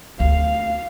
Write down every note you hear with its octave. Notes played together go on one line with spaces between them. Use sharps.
D2 F5